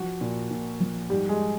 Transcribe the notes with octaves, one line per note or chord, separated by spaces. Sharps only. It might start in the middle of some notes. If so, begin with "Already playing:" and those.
Already playing: F3 F#4
A#2
A#2
F3
G#2 G3 G4
G#3 G#4